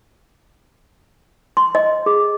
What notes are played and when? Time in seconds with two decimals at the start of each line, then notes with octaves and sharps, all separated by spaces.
1.57 C6
1.75 D#5
2.06 G#4